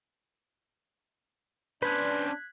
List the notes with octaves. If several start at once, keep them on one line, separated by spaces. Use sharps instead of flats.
C#4 D4 B4 C5 B5 F#6 G#6 B6